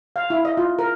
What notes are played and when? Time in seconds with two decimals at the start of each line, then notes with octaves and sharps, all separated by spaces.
0.16 F5
0.30 E4
0.45 D#5
0.57 F4
0.79 A#4